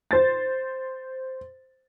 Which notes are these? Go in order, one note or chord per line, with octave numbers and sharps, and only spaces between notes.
C5 A6